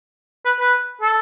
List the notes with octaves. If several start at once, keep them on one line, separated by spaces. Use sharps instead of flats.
B4
B4
A4